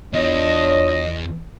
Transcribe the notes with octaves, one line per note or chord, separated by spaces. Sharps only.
E2 D4 F4 C#5 D#5